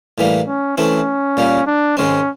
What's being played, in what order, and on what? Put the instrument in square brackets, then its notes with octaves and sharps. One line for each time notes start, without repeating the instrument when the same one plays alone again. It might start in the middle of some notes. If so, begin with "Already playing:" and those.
[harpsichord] A2 E3 G3 A#3
[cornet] C#4
[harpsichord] E3 A3 C4 E4 [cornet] C#4
[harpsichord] A#2 G3 A#3
[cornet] D4
[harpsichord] G#2 D#3 G#3 C4 [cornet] C#4